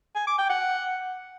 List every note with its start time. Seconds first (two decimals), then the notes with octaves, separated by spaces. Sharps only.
0.16 G#5
0.27 D6
0.38 G5
0.50 F#5